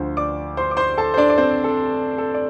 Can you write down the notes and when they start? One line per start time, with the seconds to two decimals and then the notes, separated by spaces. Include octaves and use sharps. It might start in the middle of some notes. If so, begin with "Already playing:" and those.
Already playing: D2 D3 F3 C5
0.17 D5 D6
0.57 C5 C6
0.71 D6
0.77 C5 C6
0.97 A4 A5
1.14 C5
1.17 D4 D5
1.30 D5
1.38 C4 C5
1.64 A4
2.18 A4
2.34 D5